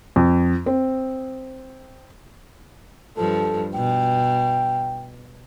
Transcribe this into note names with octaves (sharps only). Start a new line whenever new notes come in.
F2
C4
G2 F3 A4
B2 G5